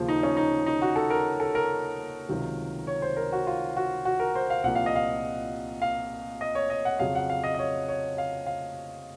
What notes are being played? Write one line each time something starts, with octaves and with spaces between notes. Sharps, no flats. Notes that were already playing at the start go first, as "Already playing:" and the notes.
Already playing: D#2 C#3 F3
D#4
C#4
D#4
D#4
F#4
A4
A#4
A4
A#4
C#2 C3 D#3 F#3
C#5
C5
A#4
F#4
F4
F#4
F#4
A#4
C5
F5
C2 A#2 F3 F#5
F5
D#5
F5
F5
D#5
C#5
D#5
F#5
F2 C#3 F#3 F5
F#5
F5
D#5
D#5
C#5
C#5
F5
F5